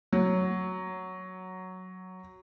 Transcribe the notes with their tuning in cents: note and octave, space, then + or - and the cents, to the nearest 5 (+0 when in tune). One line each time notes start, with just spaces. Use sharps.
F#3 +0 C#5 +0